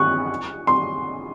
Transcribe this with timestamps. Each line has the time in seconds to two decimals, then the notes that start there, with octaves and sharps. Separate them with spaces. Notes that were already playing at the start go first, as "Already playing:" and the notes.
Already playing: C#6 F#6
0.67 C6